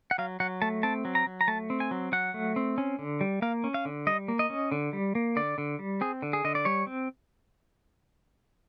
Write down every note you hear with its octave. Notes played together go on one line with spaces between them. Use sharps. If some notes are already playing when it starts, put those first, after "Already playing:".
F#5
F#3 F5
F#3 F#5
A3 A5
C4 A5
F#3
A#5
F#3
A#5
A3 A5
C4
G#5
F#3
F#3 F#5
A3
C4
C#4
D3
G3
A#3 F5
C#4
F5
D3
G3 D#5
A#3
D#5
C#4
D3
G3
A#3
D3 D5
D3
G3
C4 G#4
D3
G#4
D3 D#5
D5
G3 C#5
C4